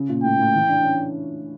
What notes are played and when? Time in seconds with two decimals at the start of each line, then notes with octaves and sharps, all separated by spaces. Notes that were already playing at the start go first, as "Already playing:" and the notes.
Already playing: C#3
0.09 A#2
0.24 A2 G5
0.39 A2
0.54 E3
0.69 D4
0.83 C#4